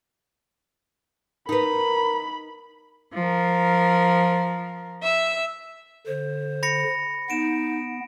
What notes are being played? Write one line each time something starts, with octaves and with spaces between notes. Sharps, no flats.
D#4 A#4 B4 B5
F3 A#4
E5 E6
D3 C5
B5 A#6 C#7
B3 D#4 D7 E7